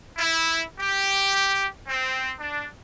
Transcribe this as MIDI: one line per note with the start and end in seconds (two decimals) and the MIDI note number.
0.17 0.63 64
0.80 1.67 67
1.88 2.33 60
2.39 2.66 62